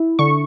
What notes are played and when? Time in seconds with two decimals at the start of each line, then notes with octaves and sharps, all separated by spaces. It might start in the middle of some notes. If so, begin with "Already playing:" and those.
Already playing: E4
0.19 D3 C#6